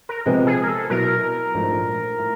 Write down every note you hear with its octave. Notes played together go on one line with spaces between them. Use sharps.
A#4
C3 F3 G#3 B3
G#4
A#4
A4
B2 F#3 B3 E4 A#4
A#1 G#2 F3 A3
A2